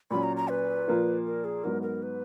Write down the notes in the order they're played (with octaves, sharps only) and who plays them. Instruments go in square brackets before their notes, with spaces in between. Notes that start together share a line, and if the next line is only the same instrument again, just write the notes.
[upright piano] A#2 F#3 C#4 [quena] B5
[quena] A#5
A#5
B4
[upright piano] A#2 F3 A#3 F4
[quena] A#4
G#4
[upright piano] G#2 F#3 B3 [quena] A#4
[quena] A#4
B4